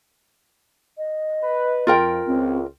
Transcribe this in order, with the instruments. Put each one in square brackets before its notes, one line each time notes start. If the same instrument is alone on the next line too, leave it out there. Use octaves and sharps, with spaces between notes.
[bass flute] D#5
[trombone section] B4
[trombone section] F2 [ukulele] F4 A#4 G5
[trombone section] C#2 [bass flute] C4